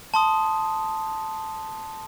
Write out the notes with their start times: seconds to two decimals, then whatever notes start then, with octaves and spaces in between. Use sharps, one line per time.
0.14 A5 C6 D#6